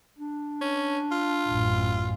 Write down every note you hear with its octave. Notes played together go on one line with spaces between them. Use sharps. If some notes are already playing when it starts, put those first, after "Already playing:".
D4
C#4
F4
A1 F#2